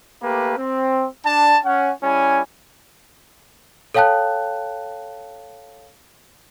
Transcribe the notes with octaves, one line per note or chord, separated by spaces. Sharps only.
A3 A#3 G4 B4
C4
D4 A5
C#4 F#5
G3 C#4 E4 G#5
A4 C#5 F5 G5 A5 F#6